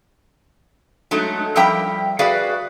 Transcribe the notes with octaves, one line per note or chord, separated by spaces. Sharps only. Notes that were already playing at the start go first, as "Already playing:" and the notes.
F#3 G#3 A3 D#4
F3 G3 A#4 E5 G5 A#5
F#4 G#4 B4 D5 E5 F5